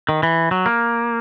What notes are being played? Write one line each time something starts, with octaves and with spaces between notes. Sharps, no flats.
D#3
E3
F#3
A#3